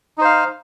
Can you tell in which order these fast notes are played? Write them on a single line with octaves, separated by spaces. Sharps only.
D#4 C5 F5